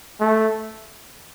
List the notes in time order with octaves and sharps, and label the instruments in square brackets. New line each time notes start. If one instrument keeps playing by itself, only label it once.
[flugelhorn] A3